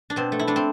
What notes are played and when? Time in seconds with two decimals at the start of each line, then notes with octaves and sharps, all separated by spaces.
0.10 D4
0.16 B2 C4
0.32 A3
0.39 E4
0.47 A3 D4
0.56 C4